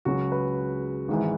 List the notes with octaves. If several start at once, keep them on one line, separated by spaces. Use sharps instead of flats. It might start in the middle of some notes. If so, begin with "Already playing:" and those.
C#2 C#3 F#3 F#4
B4
G#1 G#2 E3